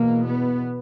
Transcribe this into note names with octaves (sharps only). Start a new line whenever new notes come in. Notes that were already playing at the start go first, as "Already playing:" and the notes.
Already playing: E2 B2 A#3
B3